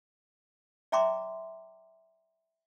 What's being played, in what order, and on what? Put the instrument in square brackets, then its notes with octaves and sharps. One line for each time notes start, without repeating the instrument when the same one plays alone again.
[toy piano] D5 E5 G5 A#5 C6 D6